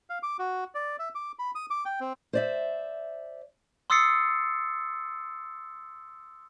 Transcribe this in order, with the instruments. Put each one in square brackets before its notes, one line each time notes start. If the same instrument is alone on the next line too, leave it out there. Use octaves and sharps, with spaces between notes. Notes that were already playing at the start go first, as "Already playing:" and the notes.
[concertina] F5
D6
F#4
D5
E5
D6
B5
D#6
D6
G5
C4
[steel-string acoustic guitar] C5 D5 E5
[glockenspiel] C6 D#6 E6 A6 C7 C#7